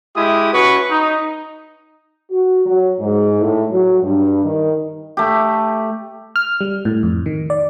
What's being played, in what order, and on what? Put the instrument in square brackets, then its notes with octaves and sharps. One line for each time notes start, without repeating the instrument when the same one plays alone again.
[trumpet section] G#3 E4 G4 D#6
C#4 F#4 B4 C#6
D#4
[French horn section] F#4
F#3
G#2
A2
F#3
G2
D#3
[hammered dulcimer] A3 G4
[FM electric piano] F6
G3
A2
F2
D#3
D5